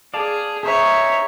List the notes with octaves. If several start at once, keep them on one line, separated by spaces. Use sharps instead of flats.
G#4 D5 F5 A5
D#4 G#4 C#5 E5